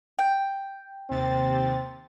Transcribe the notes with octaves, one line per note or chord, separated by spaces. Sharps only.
G5
D#2 C3 C4 A6